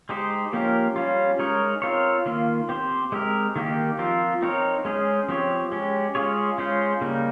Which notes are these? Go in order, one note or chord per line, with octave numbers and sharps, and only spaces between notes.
G#3 D#4 G4 C5
F3 A#3 C#4 G4 A#4
G3 C#4 F4
G#3 D#4 A#4 C#5
C4 F4 A#4 C#5
D#3 A#3 F4
C4 G4 C5
G#3 C4 G4 A#4
D#3 A#3 D#4 G4
F3 C4 F4 A#4
C4 D#4 A#4 C#5
G#3 C#4 G#4 C5
F3 C4 G4 C#5
G#3 C#4 G4
G#3 C#4 F4 G#4 C#5
G#3 C#4 F4 C5
C#3 G3 A#3 D#4